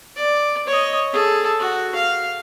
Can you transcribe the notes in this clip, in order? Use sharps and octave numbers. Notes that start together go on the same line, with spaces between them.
D5
C#5 D#5
G#4 A4
F#4
F5